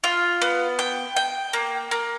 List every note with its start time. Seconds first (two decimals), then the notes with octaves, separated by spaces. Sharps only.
0.04 F4
0.42 B3
0.79 G5
1.16 G5
1.53 A#3
1.91 A#3